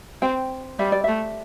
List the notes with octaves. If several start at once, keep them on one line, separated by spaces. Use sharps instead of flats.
C4 G5
G3 E5
D5
A3 E5